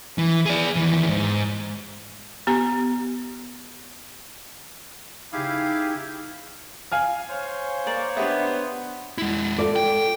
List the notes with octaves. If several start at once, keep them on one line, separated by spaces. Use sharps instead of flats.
E3
G#4 D5
D#2 E3
G#2
B3 G4 A#5
C#3 D#4 E4 G4 G#4 F5
F5 G#5 F6
C5 C#5
A#3 D5
B3 D4 G4 E5
G#3 E4
F4 A4 D5
G5